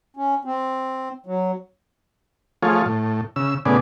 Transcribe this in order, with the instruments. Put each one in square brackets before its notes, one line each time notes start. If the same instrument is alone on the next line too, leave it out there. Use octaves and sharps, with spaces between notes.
[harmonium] C#4
C4
F#3
[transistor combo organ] F3 A3 F4 G#4 C#5
A2
C#3 E6
A2 C#3 B3 G#4 D5